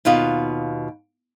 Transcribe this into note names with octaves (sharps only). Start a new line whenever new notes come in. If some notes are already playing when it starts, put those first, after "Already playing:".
D#2 B2 F4 D#5